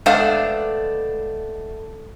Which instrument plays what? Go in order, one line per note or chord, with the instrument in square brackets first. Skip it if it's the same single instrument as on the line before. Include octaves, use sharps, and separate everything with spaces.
[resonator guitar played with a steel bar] G#3 A3 B3 D4 C5 F5